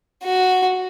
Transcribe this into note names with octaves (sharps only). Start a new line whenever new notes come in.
F#4